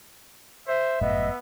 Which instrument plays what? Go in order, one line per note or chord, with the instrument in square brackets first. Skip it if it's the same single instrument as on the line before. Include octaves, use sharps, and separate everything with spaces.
[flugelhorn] C5 [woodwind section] E5
[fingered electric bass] G1 F#2 A2 [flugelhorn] B3 [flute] D#5